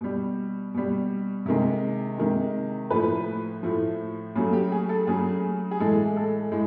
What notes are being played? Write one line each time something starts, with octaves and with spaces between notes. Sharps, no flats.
B2 G3
B2 G3
C3 D#3 G#3
C3 D#3 G#3
A2 F3 A3 B4
A2 F3 A3
C#3 F#3 A3
G4
G#4
A4
C#3 F#3 A3 G#4
G#4
A2 E3 G#3 A4
A4
A2 G#3